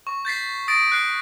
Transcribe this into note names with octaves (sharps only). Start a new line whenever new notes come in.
C#6
G6 A6 B6 C7
D#6 A6 A#6 D7
F#6 C7